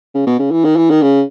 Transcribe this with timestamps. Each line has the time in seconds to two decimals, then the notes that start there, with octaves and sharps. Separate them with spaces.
0.15 C#3
0.27 B2
0.39 C#3
0.52 E3
0.64 D#3
0.76 E3
0.90 D#3
1.02 C#3